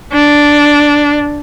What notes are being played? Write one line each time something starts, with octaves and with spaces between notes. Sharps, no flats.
D4